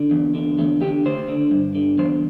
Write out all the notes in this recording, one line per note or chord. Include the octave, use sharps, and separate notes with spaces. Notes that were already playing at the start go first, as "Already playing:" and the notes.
Already playing: D3
E2
D3
E2 A3
D3 G4
D2 C5
D3
G2
D3
E2 C5